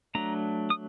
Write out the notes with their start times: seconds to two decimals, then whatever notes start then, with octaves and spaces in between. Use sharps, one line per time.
0.15 F#3 A3 D4 A#5
0.70 D#6